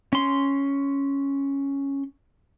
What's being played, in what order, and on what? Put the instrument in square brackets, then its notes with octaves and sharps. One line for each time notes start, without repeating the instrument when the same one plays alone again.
[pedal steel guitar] C#4 C6